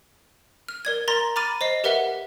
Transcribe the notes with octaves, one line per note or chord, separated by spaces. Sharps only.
F6
A#4 D5 G#6
A#4 A#5 C6 A6 A#6
A#5 B5 D6 F6 A6 D#7
C5 D#5 C7
G4 A#4 B4 E5 F#5 G7